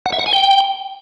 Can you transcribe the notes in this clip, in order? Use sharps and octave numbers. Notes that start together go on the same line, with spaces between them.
F#5
E5
F#5
G#5
G5